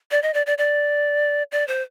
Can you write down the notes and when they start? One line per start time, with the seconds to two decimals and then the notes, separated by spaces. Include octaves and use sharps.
0.11 D5
0.23 D#5
0.34 D5
0.46 D5
0.58 D5
1.52 D5
1.68 C5